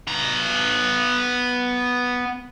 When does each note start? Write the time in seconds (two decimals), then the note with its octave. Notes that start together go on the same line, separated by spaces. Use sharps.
0.08 B3 A#5